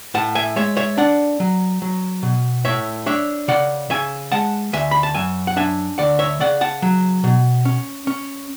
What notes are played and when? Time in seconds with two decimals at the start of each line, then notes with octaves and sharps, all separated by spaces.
0.14 A2 F#5 A5
0.35 E5 G#5
0.56 G#3 C#5 E5
0.77 C#5 E5
0.98 D4 D5 F#5
1.40 F#3
1.82 F#3
2.23 B2
2.65 A2 C#5 E5
3.06 D4 C#5 E5
3.48 C#3 D5 F#5
3.90 C#3 E5 G#5
4.32 G#3 F#5 A5
4.73 D2 E5 G#5
4.91 B5
5.03 A5
5.15 F#2 E5 G#5
5.47 F#5
5.56 D4 E5 G#5
5.98 D2 D5 F#5
6.19 C#5 E5
6.40 C#3 D5 F#5
6.61 F#5 A5
6.82 F#3
7.24 B2
7.65 C#4
8.07 C#4